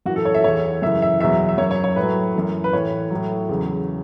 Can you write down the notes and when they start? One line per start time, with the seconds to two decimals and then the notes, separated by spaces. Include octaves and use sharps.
0.06 F#2 E3 F#4
0.16 A4
0.25 C#5
0.34 E5
0.44 E2 E3 C#5
0.82 F#2 C#3 E3 E5
1.02 E5
1.20 E2 B2 F#3 E5
1.49 E5
1.58 F#2 F#3 C#5
1.71 C#5
1.84 C#5
1.96 A2 B4
2.01 F#3
2.35 F#2 E3
2.64 B4
2.73 A2 E3 C#5
3.10 A2 F#3
3.49 E2 C#3 F#3